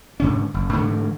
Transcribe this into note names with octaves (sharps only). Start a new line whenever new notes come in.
G#2 D3 C#4
F#1
G#2 D3 E3 A3